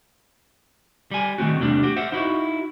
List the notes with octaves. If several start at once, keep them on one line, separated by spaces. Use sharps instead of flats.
G3 G#5
D#3 A3 C4 F#4
E2 A2 C3 G3 A3 D4
F#4 G4
C5 E5 F#5
D#4 E4 F#4